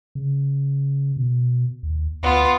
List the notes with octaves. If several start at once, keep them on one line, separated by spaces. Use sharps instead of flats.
C#3
B2
D#2
D2 B3 F4